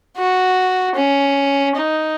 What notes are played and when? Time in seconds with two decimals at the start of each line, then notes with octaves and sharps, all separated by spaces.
0.17 F#4
0.96 C#4
1.76 D#4